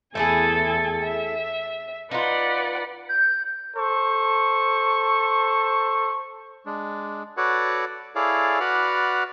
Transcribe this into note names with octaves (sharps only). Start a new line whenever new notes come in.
E2 A3 E4 G#4 A4 G#5
E5
D#4 F4 B4 D5 F#5
G6
A4 C5 C#6
G#3 D4
F#4 A4 B4 C#5 D5 F#5
E4 G#4 A4 C#5 D5 F5
F#4 B4 D5 F#5 B5 F6